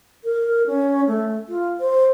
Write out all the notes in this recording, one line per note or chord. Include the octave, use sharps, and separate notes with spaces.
A#4
C#4
A3
F4
C5